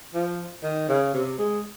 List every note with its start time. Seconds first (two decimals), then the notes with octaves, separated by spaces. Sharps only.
0.14 F3
0.63 D#3
0.89 C#3
1.14 C3
1.38 G#3